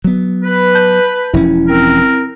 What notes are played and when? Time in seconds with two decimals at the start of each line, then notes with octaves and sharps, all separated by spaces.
0.04 F#3 B3
0.44 B4
0.75 A5 G6
1.33 E1 F3 C#4 E4
1.68 C4 A#4